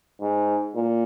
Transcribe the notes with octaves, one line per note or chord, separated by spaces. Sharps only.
G#2
A#2